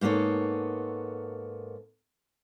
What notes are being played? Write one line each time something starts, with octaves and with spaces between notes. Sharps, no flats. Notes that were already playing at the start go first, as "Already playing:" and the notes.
G#2 A#3 B3 A4 C#5